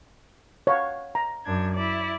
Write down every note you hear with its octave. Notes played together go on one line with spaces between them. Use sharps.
C#5 F5 F#5
A#5
F#2 D4 G#6
E4 D5